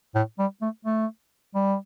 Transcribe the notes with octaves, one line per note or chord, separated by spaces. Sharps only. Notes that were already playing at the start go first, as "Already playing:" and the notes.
A2
G3
A3
A3
G3